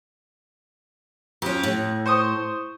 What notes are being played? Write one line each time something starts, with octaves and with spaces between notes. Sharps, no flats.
F2 C#4 G4
A2
C5 C#6 D#6